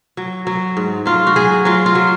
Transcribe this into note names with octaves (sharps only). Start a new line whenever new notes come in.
F#3
F#3
G#2
F#3 F4
F#4
F#3 G#4
F#3 F4
F4
F#3